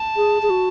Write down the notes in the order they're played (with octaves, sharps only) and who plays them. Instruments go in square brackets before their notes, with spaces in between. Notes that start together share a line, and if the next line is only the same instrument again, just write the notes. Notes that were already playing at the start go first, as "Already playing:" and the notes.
Already playing: [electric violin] A5
[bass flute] G#4
G#4
F#4